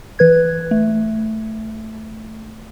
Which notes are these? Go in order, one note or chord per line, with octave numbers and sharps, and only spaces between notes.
E3 B4 G#6
A3